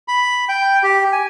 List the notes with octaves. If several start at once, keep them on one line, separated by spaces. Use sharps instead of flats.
B5
G5
G4
G#5